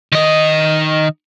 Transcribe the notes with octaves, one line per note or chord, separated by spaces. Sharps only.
D#3 D#5